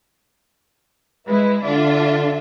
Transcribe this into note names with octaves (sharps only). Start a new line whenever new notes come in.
G#3 E4 B4
D3 D4 F4 E5